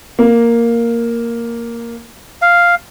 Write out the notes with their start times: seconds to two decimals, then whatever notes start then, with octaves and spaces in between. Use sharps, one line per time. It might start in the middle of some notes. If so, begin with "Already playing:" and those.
0.19 A#3
2.42 F5